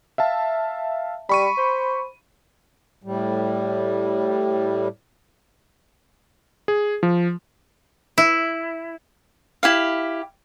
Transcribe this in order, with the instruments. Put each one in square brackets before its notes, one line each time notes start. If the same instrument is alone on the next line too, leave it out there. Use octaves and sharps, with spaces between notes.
[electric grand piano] E5 F5 A5
[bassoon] G3 [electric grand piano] B5 C#6 D#7
[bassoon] C5
[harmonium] A2 G3
[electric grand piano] G#4
F3
[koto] E4
[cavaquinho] E4 G4 F5